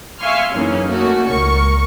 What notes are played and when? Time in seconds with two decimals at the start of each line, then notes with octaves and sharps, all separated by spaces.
0.19 E5 F5 G#5 C6 C#6 F6
0.52 F#2 C#3 E3 A#3 C#4 D#4
0.88 A3 A#3 C#4 D#4 F#4
1.28 C#2 A#4 C#6